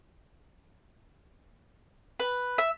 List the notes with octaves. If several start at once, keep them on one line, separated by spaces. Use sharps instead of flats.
B4
E5